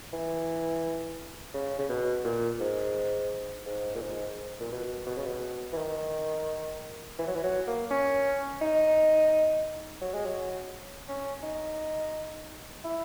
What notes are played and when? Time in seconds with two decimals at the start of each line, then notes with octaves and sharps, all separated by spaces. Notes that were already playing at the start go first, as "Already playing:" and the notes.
0.13 E3
1.54 C#3
1.79 C#3
1.89 B2
2.24 A#2
2.60 G#2
3.66 G#2
3.95 A#2
4.02 G#2
4.60 A#2
4.72 B2
5.07 B2
5.17 C#3
5.25 B2
5.73 E3
5.77 D#3
7.19 E3
7.27 F#3
7.35 E3
7.43 F#3
7.67 A#3
7.91 C#4
8.61 D#4
10.01 F#3
10.14 G#3
10.26 F#3
11.08 C#4
11.43 D#4
12.84 E4